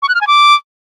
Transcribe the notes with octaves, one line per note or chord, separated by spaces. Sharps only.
C#6
F#6
F6
G#5
D6